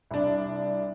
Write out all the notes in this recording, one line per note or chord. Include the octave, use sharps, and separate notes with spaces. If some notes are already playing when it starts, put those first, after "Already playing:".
C2 D4